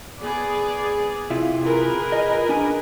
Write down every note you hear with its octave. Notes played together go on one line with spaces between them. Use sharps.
B3 G#4 D5
C3 E4 F4
G#4 A#4 B4
F4 D#5
D4 G#5